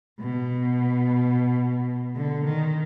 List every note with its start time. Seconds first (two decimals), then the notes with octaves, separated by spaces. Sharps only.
0.20 B2
2.16 D3
2.44 D#3